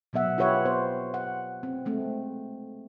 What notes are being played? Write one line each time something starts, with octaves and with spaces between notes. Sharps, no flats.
B2 F#3 B3 E5 F#5
F4 G4 B4 C#5 E5 F#5
B3 C5
F#5
C4
G#3 A3 C4